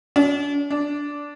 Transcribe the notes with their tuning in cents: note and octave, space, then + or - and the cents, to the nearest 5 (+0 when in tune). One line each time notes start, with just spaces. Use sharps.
D4 -40
D4 -10